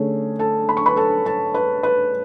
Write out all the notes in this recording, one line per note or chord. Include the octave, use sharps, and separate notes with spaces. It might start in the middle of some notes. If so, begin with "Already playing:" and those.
Already playing: D3 A3 C#4 G#4
A4 A5
B5
C#6
B4 B5
A4 A5
A4 A5
B4
B4